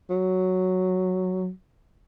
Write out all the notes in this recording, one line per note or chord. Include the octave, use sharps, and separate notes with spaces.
F#3